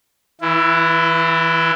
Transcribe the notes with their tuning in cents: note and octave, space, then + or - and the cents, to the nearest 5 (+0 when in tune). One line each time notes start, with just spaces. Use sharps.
E3 -15 E4 +25